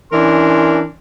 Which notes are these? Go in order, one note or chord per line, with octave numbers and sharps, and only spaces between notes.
E3 C#4 D4 A#4 C6